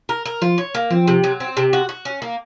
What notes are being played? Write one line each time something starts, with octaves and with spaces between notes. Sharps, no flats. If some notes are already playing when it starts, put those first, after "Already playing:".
A#4
A#4
F3 F4
C#5
A#3
F3 C4
C3
F#3
C4
C3
F#4
F#4
C#4
A#3